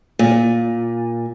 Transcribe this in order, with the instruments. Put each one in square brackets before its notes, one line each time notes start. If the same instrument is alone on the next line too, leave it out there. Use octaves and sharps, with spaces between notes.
[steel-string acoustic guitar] A#2